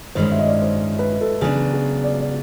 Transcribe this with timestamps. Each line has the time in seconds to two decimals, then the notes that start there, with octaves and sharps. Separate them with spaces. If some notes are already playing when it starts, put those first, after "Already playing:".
0.15 G2 D#3 G#3 C#4 C5
0.32 E5
0.39 D#5
0.47 D5
0.62 C5
0.99 B4
1.21 A4
1.41 C#3 F#3 B3 D4 G#4
1.73 G#4
2.04 D5
2.20 D5